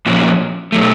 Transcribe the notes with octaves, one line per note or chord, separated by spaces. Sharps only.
A#2 F3 A#3 C#4 F#4
B2 F#3 A3